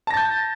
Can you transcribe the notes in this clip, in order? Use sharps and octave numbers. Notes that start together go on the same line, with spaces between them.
A5 G6 A6 A#6